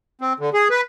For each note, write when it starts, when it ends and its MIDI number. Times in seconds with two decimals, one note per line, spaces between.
0.21 0.33 60
0.39 0.50 50
0.54 0.68 68
0.70 0.81 71